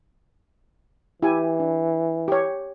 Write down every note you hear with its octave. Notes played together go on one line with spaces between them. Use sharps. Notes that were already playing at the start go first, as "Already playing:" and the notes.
E3 E4 G4 G#5
D4
G4 C#5